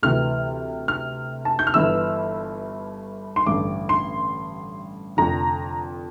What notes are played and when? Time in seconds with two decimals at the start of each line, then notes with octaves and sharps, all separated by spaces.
0.03 D2 C3 E3 F6
0.88 F6
1.45 A5
1.59 G6
1.67 F6
1.74 G1 G2 E3 E6
3.36 C6
3.46 A1 G2 D3 D6
3.89 C6
5.17 F1 F2 D3 A#5